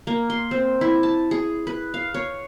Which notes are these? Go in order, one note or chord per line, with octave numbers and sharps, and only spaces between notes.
A#3
C6
C4
E4
A5
G#4
B4
F5
C#5